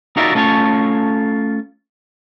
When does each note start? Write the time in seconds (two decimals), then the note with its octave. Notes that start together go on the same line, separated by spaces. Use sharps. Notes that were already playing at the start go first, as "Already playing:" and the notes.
0.17 D#4 F4 F#4 A#4 D5 E5
0.35 A3 C#4 F4 A4 C#5